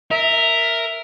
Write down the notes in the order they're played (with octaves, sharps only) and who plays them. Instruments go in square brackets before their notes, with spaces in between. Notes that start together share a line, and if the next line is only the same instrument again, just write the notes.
[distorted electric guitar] A#4 [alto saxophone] E5